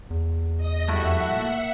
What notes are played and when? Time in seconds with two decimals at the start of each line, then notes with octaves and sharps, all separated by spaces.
0.10 E2
0.57 D#5 A#6
0.88 F2 G3 A3 E4 F#4 E5 F#5
1.31 A#2 A#3